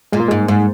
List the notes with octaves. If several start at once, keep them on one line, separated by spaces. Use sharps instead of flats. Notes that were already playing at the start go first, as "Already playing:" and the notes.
A#2 G#3
A#3
G#2 G#3
G#2